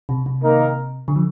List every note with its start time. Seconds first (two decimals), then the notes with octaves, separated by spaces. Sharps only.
0.09 C3
0.26 C3
0.42 D#3 A#3 D#4 A#4
1.08 D3
1.16 F3